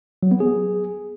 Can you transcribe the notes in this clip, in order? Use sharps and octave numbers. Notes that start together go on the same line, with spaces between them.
F#3
B3
G#4